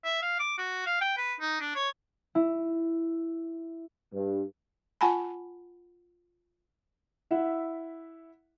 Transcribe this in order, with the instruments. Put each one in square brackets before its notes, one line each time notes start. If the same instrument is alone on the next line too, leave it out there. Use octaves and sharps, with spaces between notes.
[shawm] E5
F5
D6
F#4
F5
G5
B4
D#4
D4
C#5
[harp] E4
[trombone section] G2
[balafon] F4 F#5 G#5 A5 B5
[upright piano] E4 E5 F#5